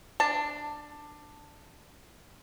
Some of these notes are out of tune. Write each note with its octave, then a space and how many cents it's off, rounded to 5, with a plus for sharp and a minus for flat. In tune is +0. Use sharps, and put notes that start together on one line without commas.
D4 +10 A5 +15